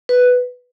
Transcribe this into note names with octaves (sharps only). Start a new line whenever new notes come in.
B4